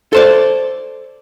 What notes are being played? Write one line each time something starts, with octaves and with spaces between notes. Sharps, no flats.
A4 C5 D5